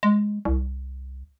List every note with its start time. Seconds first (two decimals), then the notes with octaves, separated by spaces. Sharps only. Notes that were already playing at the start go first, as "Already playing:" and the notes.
0.03 G#3
0.45 C2